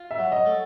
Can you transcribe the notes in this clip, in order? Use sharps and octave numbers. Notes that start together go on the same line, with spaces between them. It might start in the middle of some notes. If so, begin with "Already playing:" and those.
Already playing: F4
E5
F#3
D#5
A3